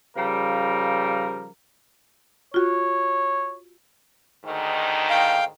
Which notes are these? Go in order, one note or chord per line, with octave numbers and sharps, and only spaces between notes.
C#3 F3 G3 A#4
F4 F#4 C#5
D2 G#2 D#3
F5 G5